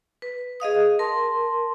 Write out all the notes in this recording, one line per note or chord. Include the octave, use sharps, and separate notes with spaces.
B4
G#4 D#5 F5 D#6
A#4 A5 C6